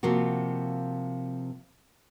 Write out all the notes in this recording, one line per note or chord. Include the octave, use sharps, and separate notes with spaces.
C3 F3 A#3 F4 F#4